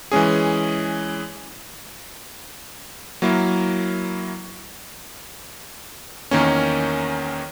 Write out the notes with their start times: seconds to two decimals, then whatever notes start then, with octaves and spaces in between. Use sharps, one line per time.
0.12 E3 G#3 C#4 G#4
3.22 F#3 A#3 E4 A#4
6.31 E2 D#3 A#3 C#4